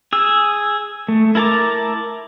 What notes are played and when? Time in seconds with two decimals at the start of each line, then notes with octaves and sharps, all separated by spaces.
0.13 G#4 E6
1.08 A3
1.35 E4 A#4 A5 A#5 D6